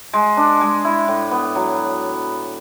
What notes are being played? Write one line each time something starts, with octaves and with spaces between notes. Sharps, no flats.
G#3
D4
G#3
E4
A2
B3
F#3